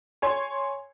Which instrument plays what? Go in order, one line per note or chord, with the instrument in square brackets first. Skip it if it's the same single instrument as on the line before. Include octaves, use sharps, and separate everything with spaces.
[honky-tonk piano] C#5 G#5 C6